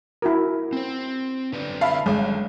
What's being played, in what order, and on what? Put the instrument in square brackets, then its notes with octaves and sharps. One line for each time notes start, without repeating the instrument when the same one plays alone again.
[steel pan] E4 F#4 A#4
[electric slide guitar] C4 C5
D3 B4 D5
[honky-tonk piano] E5 F5 [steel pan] A5 B5
[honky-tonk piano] G1 [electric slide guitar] G3 [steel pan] G#3